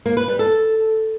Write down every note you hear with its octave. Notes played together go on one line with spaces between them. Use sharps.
A#3
B4
G3
A4